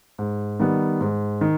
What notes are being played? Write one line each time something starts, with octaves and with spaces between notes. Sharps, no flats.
G#2
D#3 G3 B3
G#2
D#3